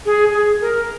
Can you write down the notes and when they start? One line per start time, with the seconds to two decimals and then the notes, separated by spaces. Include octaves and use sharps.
0.05 G#4
0.33 G#4
0.61 A#4